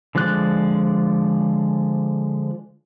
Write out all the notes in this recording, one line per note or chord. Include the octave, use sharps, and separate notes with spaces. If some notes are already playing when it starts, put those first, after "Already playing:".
D3 F3 G#3 D5 F#6